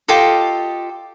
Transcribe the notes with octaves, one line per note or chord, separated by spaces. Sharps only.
F4 G4 A4 D#5